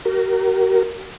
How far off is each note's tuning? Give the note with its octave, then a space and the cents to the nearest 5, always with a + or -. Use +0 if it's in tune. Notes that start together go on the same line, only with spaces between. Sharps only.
F#4 +45 A#4 +0